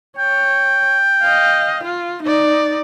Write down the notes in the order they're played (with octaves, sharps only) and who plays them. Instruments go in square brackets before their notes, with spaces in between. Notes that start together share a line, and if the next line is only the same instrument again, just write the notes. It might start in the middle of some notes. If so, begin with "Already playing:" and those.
[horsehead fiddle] C#5 [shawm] G5
[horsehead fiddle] D#5 F5
F4
D#4 D5